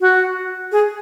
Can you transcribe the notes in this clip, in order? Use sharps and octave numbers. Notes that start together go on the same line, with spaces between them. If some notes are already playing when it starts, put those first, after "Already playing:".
F#4
G#4